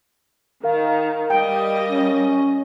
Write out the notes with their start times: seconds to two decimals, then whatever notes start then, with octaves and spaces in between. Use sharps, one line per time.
0.63 D#3 A#4 F5
1.30 G3 D#5 G5
1.89 C#4